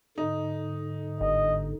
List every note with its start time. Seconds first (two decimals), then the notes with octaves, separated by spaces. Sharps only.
0.18 G#2 D3 D#4
1.21 G1 D#5